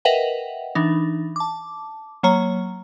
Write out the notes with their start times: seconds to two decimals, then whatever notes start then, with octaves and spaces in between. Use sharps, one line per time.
0.05 A#4 B4 D#5 E5 F#5 G5
0.75 E3 D4 D#4
1.36 A5 D6
2.23 F#3 A#3 C#5 A#5